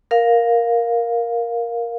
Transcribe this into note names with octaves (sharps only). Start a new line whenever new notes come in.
A#4 F5